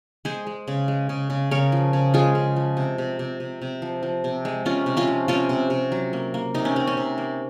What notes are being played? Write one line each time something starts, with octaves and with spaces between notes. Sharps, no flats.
G#3 G#4 C5
G#3
C#3
G#3
C#3
C#3
C#3 A#4 C#5
F3
C#3
G#3 F4 G#4
C#3
F3
C3
C3
C3
C3
C3
F3
F3
C3
G#3
C3 C#4 F4
C3
C#4 F4
F3
C3 C#4 F4
C3
C3
F#3
A#3
A#3
C3 D#4
C#4
C3 C4
C#4
C3
A#3